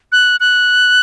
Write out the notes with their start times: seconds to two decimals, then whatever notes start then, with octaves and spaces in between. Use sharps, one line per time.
0.12 F#6
0.40 F#6